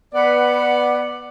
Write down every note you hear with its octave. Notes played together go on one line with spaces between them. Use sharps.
B3 B4 D5 F#5